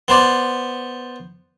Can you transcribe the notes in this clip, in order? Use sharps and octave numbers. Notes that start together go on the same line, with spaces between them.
B3 C5 D5